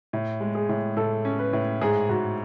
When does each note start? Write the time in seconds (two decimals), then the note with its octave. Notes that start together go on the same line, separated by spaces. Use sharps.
0.13 A2
0.40 G#3
0.55 G#4
0.69 A2
0.97 A2 A4
1.25 C#4
1.39 B4
1.53 A2
1.81 G#2 G#4
2.09 G#2 F#4